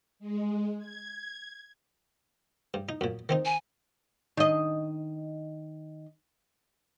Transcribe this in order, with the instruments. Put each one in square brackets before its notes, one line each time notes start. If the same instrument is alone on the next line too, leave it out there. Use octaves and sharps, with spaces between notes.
[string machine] G#3
G#6
[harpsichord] G2
D#4
F#2 A#2
D#3 C4 D#4
[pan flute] G#5
[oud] D#3 D#5